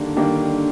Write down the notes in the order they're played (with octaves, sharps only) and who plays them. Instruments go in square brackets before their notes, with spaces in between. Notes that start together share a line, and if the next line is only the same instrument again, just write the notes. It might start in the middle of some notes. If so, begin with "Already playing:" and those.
Already playing: [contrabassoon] D3 [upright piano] D#3 G3 A#3 D4
[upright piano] D#3 G3 A#3 D4